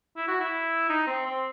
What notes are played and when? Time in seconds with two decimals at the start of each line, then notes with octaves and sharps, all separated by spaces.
0.17 E4
0.28 F#4
0.40 E4
0.89 D#4
1.07 C4
1.25 C4